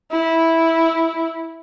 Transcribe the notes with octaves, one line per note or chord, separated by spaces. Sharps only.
E4